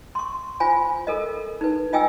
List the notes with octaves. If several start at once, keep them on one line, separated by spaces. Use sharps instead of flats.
C6 C#6
F4 C5 G#5 B5
A4 A#4 D#5
D#4 B4
F4 D#5 G5 G#5 E6